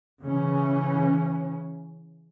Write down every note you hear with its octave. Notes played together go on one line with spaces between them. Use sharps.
C#3 E3 C#4